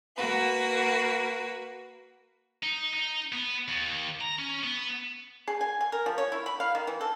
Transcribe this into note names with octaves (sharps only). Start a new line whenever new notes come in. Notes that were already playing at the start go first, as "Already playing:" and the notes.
A#3 F#4 B4
D#4
D#4
B3
D#2
A#5
C#4
B3
G#4
G#5
G#5
A#4
F3
C#5
E4
B5
F5
D#3
E3
A4